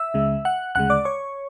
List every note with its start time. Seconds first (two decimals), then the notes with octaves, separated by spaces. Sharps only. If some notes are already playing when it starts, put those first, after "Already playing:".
Already playing: E5 E6
0.14 C#2 C#3 G#3
0.45 F#5 F#6
0.75 D2 C#3 G#3 F#5 F#6
0.90 D5 D6
1.05 C#5 C#6